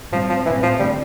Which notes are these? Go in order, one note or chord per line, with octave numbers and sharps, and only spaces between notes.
A2 F3 G3 C4
F3
A2 E3 G3 C4
F3
D3 G3 A3 C4